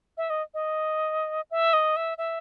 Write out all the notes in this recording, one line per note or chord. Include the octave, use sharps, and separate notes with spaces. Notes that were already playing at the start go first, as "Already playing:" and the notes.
E5
D#5
D#5
E5
D#5
E5
E5